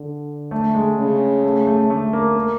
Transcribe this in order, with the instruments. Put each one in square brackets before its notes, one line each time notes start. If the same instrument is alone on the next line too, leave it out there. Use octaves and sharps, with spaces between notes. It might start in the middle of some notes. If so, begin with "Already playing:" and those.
Already playing: [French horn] D3
[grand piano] A3
G#3
[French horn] C#3
[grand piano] A3
A3
[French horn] D3 [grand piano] A3
[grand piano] A#3
A#3